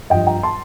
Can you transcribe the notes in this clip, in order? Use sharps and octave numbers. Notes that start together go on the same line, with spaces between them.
G2 F3 D#5 G5
G5 A#5
A5 C6